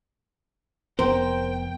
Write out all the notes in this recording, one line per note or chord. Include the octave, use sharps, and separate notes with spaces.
F1 F2 B3 A#4 C5 G5